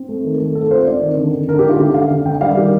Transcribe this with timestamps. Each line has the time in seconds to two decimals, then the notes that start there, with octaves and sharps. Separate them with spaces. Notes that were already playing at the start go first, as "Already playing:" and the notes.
Already playing: C4
0.09 A3
0.24 D#3
0.40 A3
0.55 C4 A4
0.71 F4 C5
0.87 C4 D5
1.02 D#3
1.17 D3
1.33 D3
1.48 D3 A#4
1.59 G4
1.64 D#4
1.69 F4
1.79 D3 G4
1.94 D3 F5
2.11 D3
2.26 D3 G5
2.41 G3 F5
2.57 D#3 G4